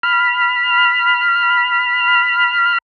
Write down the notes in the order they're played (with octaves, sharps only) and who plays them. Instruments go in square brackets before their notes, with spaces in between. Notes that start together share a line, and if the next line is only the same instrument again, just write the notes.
[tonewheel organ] B5 F6